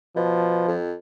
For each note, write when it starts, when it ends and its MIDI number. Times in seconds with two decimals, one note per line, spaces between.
0.16 0.64 47
0.16 0.76 53
0.68 0.94 41